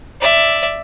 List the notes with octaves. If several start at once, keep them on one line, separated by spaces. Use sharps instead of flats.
D5 E5